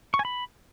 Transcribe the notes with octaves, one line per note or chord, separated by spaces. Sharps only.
C#6
G#5
B5